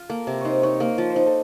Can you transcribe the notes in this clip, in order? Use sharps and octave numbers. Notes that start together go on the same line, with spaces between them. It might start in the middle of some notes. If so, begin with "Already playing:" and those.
Already playing: F4
A#3 A4
C3 A#4
D#4 C5 C#5
D#4 C#5
A#3
F3
C5
D#4
A4